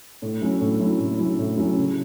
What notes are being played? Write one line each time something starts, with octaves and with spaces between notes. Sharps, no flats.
A2
F#3 C#4 E4
A2
F#3 C#4 E4
A2
F#3 C#4 E4
A2
F#3 C#4 E4
C#3